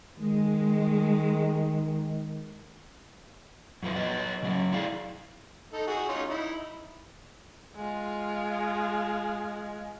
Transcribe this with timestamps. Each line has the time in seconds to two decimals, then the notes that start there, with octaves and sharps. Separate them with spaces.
0.18 D#3 G#3
3.83 F#2 F3 B4
3.96 F#3 B4 D#5
4.43 C#3 F#3 C#4
4.72 E4 G#4 D5 F5
5.73 D#4 A4
5.87 F#4 G#4
6.09 C#4 D#4 F4
6.30 D#4 E4
7.76 G#3 F4